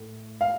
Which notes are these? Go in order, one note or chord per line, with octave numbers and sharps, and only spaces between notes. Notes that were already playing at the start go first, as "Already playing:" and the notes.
Already playing: A2
F5